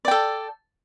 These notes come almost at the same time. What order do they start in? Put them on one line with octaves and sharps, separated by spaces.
D5 G5 A4